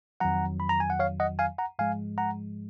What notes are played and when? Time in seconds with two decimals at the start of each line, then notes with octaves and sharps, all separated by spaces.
0.20 F2 D#3 F#3 F#5 A#5
0.60 B5
0.69 A#5
0.80 G#5
0.90 F#5
0.99 C#5 F5
1.20 D#5 F#5
1.39 F5 G#5
1.58 F#5 A#5
1.79 G#2 F3 G#3 F5 G#5
2.18 F#5 A#5